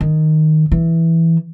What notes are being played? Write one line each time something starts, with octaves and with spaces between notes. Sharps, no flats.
D#3
E3